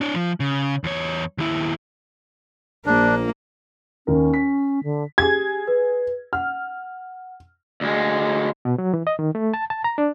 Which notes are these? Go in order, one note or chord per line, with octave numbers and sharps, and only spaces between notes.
D4 C#5
F3
C#3
E2 C#5
D#2 E4
A#1 A#3 D4
D#2 C#4 A#4
B6
D3
G4 G#4 G#6
B4
F#5 F6
D2 G#3
B2
F#3
E3
D#5
D#3
A3
A5
A5
A#5
D4